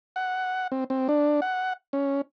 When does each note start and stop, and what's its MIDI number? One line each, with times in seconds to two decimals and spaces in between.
0.16 0.67 78
0.72 0.84 60
0.90 1.08 60
1.09 1.40 62
1.42 1.73 78
1.93 2.21 61